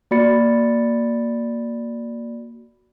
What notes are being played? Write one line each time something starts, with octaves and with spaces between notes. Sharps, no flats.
A#3 F#4 D5 B5 A6 C#7